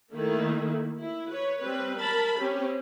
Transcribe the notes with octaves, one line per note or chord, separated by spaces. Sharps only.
D#3 A3 A#3 E4
E4
B4 C#5
G3 C4 B4
A#4 A5 B5
C4 C#4 G4